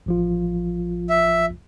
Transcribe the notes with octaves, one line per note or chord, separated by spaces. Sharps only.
A1 F3 F4
E5